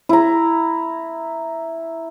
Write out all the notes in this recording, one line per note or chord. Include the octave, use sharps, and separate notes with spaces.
E4 A#5